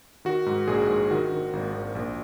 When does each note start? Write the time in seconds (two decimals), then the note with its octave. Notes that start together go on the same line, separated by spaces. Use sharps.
0.25 D#3 F#4
0.46 G#2
0.68 A#1 G#4
0.89 G#2
1.11 D#3 F#4
1.32 D#3
1.53 G#1
1.75 G#1
1.95 A#1